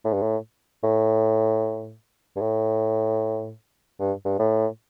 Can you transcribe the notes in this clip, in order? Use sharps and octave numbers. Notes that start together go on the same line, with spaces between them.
A2
G2
A2
A2
G2
A2
G2
G2
A2